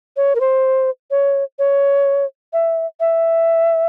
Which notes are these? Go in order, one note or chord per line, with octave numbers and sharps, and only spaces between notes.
C#5
A#4
C5
C#5
C#5
E5
E5